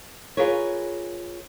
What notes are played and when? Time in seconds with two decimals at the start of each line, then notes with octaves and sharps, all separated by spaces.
0.37 F4 G#4 A#4 B4 C#5